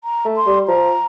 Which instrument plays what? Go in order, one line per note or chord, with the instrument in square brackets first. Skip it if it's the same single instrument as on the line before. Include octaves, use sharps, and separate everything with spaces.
[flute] A#5
[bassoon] A3
[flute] C6
[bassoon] G3
[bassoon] F3 [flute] A#5